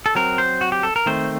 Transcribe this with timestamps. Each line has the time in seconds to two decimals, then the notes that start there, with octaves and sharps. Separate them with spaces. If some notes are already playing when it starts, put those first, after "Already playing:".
0.06 A4
0.15 F#3 C4 A#4
0.38 C5
0.61 F#4
0.72 G4
0.83 A4
0.96 A#4
1.06 D#3 A3 C4 C5